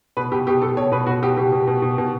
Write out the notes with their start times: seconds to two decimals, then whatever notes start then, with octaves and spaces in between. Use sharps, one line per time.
0.17 B2 B4
0.32 B2 G4
0.47 B2 G4
0.62 B2 A4
0.77 B2 C#5
0.92 B2 B4
1.07 B2 F#4
1.22 B2 G4
1.37 B2 G4
1.52 B2
1.67 B2
1.82 B2
1.98 B2